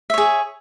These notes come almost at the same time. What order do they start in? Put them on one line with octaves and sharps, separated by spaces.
E5 C#5 G#4